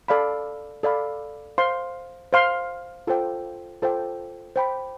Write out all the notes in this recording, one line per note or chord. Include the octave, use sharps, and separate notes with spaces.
A4 D5 F5 B5
A4 D5 F5 B5
C5 F5 C6
C5 F5 C6
F4 A4 C5 G5
F4 A4 C5 G5
C5 G5 B5